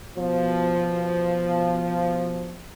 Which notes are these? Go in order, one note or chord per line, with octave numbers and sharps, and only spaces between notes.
B2 F3